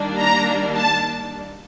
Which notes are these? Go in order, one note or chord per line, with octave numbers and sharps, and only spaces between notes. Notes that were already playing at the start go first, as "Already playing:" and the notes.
Already playing: D#3 G3 A#3 D4
A#5
A5